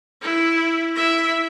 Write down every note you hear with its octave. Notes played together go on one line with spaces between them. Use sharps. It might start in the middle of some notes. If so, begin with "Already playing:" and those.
E4
E4 E5